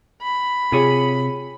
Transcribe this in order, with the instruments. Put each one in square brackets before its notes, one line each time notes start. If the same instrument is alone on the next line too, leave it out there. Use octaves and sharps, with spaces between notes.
[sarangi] B5
[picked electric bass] C3 [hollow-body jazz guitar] F4 G#4 C#5